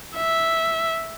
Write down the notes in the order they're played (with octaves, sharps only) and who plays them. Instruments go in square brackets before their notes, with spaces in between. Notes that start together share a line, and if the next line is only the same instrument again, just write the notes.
[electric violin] E5